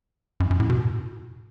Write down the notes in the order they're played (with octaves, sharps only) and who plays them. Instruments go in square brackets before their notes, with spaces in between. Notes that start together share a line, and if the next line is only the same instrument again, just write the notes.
[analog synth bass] F#2
F#2
A2
B2